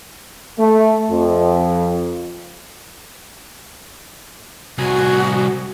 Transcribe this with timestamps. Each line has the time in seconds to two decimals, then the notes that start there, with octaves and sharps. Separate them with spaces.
0.58 A3
1.11 F2
4.78 C2 F#4 G#4